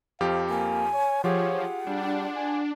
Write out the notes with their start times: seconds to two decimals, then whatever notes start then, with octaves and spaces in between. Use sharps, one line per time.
0.21 F2 F3 G4 F5
0.50 A#3 G#5
0.94 C#5
1.24 F3 F4 G4 G#4 C#5 F#5
1.87 G3 D4
2.36 G#5